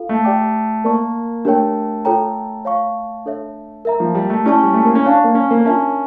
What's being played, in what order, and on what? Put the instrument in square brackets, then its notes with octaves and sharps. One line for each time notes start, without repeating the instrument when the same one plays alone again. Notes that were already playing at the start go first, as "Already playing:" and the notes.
Already playing: [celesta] F4 A4 F5
[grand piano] A3
[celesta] G4 D5 G5 D6
[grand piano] A#3 [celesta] A#4 D5 A5 C#6
[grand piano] A3 [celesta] D4 G4 A#4 C#5 G5
[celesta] F4 A4 C#5 G5 A#5
C#5 F5 C#6
D4 A4 C#5 E5
A#4 E5 A#5
[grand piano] F3
G3
A3
[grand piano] C#4 [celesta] E4 G4 D5 A5 C#6
[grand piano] G3
A3
A#3
C#4
[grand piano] D4 [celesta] C#5 F5 A5 C#6
[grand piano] A#3
C#4
A#3
[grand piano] C#4 [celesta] D4 F4 A#4 E5 A5